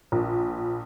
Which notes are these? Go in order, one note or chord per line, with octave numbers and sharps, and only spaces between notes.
A#1